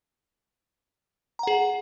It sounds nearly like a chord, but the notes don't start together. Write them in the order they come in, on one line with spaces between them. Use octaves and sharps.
A#5 F#5 G#4